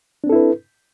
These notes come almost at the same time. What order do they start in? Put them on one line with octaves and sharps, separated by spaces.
D4 C4 A4 E4 B4